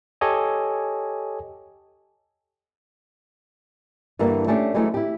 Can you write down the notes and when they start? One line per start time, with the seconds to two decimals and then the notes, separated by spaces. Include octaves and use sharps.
0.21 G4 A4 C#5 D#5 G#5
4.19 G2 D3 E3 G3 A#3 D4
4.47 A3 C#4 D4 G4
4.74 E3 F#3 G#3 A3 E4
4.94 E4 G4